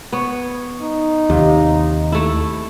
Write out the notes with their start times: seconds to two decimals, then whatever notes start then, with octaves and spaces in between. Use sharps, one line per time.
0.12 B3 C#5
0.82 D#4
1.30 D#2 C3
2.12 A3 E4